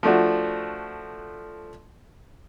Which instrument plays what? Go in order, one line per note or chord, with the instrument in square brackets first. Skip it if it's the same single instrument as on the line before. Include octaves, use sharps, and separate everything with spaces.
[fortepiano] F3 A3 D4 F#4